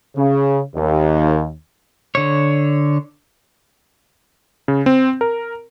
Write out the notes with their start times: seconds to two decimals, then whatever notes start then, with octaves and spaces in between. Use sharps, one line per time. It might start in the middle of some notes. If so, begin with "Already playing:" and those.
0.16 C#3
0.75 D#2
2.15 D3 C#5
4.68 C#3
4.86 C4
5.21 A#4